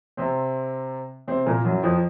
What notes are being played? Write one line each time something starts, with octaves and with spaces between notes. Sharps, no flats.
C3 C4
C3 C4
A#2 A#3
F#2 F#3
F2 F3